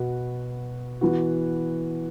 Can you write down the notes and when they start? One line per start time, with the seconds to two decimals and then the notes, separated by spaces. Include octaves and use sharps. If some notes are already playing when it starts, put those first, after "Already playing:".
Already playing: B2 B3 F#4
1.01 E3 B3 F#4